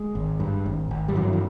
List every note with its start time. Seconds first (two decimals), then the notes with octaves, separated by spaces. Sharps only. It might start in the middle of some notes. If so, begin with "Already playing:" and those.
Already playing: G#3
0.15 G#1
0.40 G2
0.66 G#1
0.91 G#1
1.08 G3
1.15 G2 E3 F#3
1.33 E3